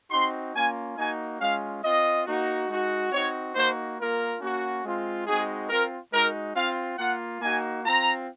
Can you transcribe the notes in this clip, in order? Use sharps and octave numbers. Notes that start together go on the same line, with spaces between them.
C4 D#4 F#4 C6
A#3 C#4 F4 G#5
A#3 D#4 F#4 G#5
G#3 C#4 F4 F5
C4 F4 D#5
A#3 D#4 F#4
G#3 D#4 F#4
C4 D#4 F#4 C#5
A#3 D#4 F#4 C5
A#3 F4 A#4
A#3 C#4 F#4
G#3 C4 F4
G#3 C4 D#4 F#4 G#4
C4 F4 A#4
G#3 D#4 F#4 A#4
C4 F4 F5
A#3 F4 F#5
A#3 D#4 F#4 G#5
C4 F4 A#5